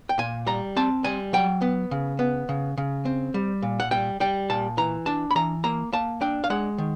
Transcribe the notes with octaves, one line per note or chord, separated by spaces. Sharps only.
G5
A#2 G#5
G3 A#5
C4 A5
G3 G#5
F#3 G5
B3
C#3
B3
C#3
C#3
C4
G3
A#2
F#5
G3 G5
G3 G5
A#2 A5
E3 A#5
D4 A5
B5
E3 A#5
A#3 A#5
A#3 A5
D4 G5
F5
G#3 F#5
D#3